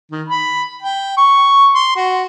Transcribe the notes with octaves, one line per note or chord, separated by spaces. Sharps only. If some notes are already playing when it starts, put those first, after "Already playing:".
D#3
B5
G5
C#6
C6
F#4